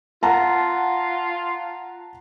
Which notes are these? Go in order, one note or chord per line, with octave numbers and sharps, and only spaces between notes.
F4 F#5 A5 A#5